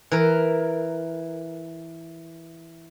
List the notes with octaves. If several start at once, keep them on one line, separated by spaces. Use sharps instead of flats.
E3 A#4